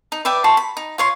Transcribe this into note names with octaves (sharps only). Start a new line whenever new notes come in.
D#4
B4 D5 E5 G5
F#4 A5 C6
B5
D#4
F4 C#5 C6